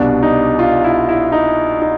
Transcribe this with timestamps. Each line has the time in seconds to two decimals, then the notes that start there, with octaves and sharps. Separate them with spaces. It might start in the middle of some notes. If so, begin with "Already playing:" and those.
Already playing: C2 B2 G3 D4
0.23 D#4
0.59 F4
0.84 E4
1.09 E4
1.32 D#4
1.82 D#4